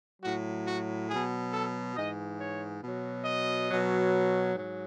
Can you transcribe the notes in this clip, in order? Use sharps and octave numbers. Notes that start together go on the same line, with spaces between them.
F#3 F#4
A2
F#4
B2 F#3 G#4
A4
G#2 E3 D#5
C#5
B2 F#3
D#5
B2 F#3
G#2 F#3